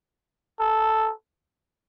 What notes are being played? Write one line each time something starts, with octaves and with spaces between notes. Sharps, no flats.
A4